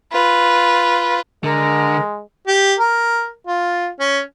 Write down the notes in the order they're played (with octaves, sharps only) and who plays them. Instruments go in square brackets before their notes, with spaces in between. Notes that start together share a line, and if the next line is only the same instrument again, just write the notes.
[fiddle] F4 B4
[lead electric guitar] D3 [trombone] G#3 [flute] A#4
[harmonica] G4
A#4
F4
C#4